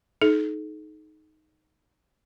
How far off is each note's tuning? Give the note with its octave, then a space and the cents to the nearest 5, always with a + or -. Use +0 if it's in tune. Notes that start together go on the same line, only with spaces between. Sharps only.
D#4 +0 A4 -45